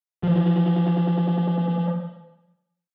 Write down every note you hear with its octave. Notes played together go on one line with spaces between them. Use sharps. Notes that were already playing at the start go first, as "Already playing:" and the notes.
E3 F3